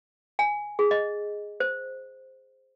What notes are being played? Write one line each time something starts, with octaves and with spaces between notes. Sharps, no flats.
G#5
G#4
D#5
C5